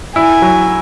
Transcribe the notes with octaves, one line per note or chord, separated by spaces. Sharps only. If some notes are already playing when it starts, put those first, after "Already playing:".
E4 G#5
F#3